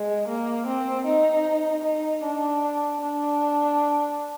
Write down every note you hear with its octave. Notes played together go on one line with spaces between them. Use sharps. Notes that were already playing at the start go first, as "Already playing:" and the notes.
Already playing: G#3
A#3
C4
D#4
D#4
D4
D4